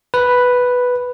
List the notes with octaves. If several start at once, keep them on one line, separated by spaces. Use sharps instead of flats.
B4